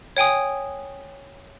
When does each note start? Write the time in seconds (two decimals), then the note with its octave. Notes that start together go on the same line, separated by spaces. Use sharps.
0.17 C#5 G5 G#5 D#6